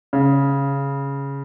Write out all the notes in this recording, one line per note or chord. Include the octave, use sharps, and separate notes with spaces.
C#3